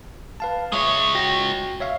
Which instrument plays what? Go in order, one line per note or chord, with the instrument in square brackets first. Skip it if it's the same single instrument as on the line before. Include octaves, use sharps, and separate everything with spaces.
[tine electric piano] B4 F5 A5
[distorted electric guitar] G#3 C#5 [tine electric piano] E5 C#6 D#6
[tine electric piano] F#4 G5 A#6
C#5 E5 F5